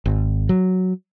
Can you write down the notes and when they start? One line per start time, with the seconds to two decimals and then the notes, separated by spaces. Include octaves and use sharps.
0.06 G#1
0.49 F#3